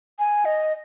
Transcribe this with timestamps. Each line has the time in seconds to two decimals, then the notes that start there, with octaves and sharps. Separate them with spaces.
0.19 G#5
0.45 D#5